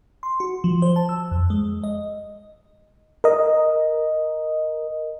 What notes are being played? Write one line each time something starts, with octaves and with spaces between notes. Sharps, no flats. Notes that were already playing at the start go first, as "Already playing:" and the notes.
C6
F#4
F3
C5
A5
E6
F2
G#3
D#5
A#4 D#5